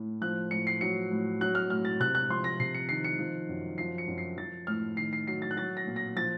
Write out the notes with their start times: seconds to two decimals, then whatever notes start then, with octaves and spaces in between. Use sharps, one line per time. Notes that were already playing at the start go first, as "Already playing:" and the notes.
Already playing: A2
0.21 F3 F#6
0.51 A2 C#7
0.67 C7
0.81 F#3 C#7
1.11 A2
1.41 F#3 F#6
1.55 F6
1.70 A2 F6
1.85 A6
2.00 C3 F#6
2.15 F#6
2.30 F3 C6
2.44 A#6
2.60 C3 C7
2.74 C#7
2.89 D#3 C7
3.04 C#7
3.19 F3
3.49 F#2
3.78 F3 C7
3.98 C#7
4.08 F#2
4.18 C7
4.38 F3 A6
4.67 A2 F6
4.97 D#3 C7
5.13 C7
5.27 F#3 C7
5.42 A6
5.51 F#6
5.56 F#3 A6
5.77 A#6
5.87 A#2
5.96 A#6
6.16 F3 A6